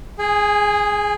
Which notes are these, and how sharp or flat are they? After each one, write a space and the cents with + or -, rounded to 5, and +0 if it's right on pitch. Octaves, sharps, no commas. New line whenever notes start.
G#4 +0 G#5 -35